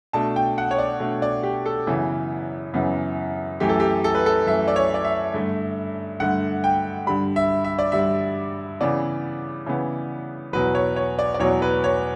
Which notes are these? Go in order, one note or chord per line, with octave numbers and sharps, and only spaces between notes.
B2 A3 D4 A5
G5
F#5
C#5
D5
B2 A3 D4
D5
G4
A4
F#2 C#3 E3 B3
F#2 C#3 E3 B3
F#2 E3 A3 G4
A4
G4
A4
B4
A4
F#2 E3 A3 E5
D5
C#5
D5
E5
G2 D3 A3
G2 D3 A3 F#5
G5
G2 D3 G3 B5
E5
E5
D5
G2 D3 G3 E5
C#3 E3 B3 D5
C#3 E3 B3
E2 B2 F#3 B4
C#5
C#5
D5
D5
E2 B2 F#3 C#5
B4
C#5